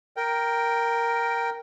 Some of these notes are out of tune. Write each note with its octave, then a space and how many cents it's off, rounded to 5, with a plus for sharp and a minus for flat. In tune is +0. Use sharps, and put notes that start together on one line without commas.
A#4 +0 G5 -5